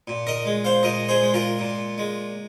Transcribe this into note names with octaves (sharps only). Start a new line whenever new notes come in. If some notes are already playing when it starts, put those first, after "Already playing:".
A#2
A#4 D#5
G#3
C5 F5
A#2 A#4 D#5
G#4 C5
G#3
F4 A#4
A#2
G#3